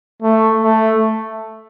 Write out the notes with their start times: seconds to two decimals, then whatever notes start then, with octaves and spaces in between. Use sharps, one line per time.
0.22 A3
0.63 A3